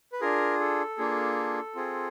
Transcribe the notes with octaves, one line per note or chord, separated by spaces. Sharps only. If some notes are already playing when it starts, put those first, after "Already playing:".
B4
D4 F4 G#4 A#4
A4
A#3 D4 F4 G#4
C4 F4 G#4